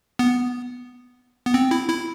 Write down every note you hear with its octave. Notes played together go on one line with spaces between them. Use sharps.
B3
B3
C4
E4
E4